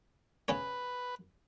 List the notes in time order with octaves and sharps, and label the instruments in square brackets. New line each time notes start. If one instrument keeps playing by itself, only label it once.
[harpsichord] C#3 C#4 C#5 [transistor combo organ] B4